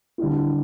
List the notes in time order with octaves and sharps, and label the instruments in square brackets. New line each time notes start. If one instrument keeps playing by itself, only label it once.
[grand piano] D3 G3 C4 E4